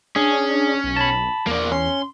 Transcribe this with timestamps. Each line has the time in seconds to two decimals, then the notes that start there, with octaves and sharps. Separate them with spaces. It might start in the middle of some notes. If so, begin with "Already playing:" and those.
0.16 C#4 D4 G#4
0.84 B1
0.96 A5 B5
1.47 E2 A#3 D4
1.72 C#4 C6